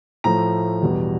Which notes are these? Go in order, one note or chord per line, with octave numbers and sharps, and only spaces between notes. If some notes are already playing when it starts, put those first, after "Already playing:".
A2 F3 A3 A#5
E2 B2 G3